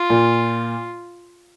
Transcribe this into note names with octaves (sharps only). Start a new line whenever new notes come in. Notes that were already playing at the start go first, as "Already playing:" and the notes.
Already playing: F4
A#2